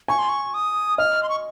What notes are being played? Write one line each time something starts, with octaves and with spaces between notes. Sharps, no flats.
G#5 C#6
C6
C#6
D#6
D#5 F6
C6
C#6